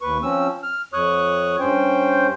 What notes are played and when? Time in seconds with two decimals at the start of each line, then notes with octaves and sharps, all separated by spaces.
0.02 D#2 B4 C#6
0.23 F3 C4 C#4 E6
0.63 F6
0.93 F2 C#5 C#6 D#6 F#6
1.60 G2 C#4 C5 G5